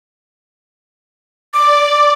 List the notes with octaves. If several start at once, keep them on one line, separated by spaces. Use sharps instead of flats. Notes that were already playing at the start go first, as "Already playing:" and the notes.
D5 D6